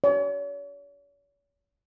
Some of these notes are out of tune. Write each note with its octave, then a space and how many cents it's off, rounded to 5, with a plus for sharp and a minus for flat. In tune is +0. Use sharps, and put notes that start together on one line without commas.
C#5 +40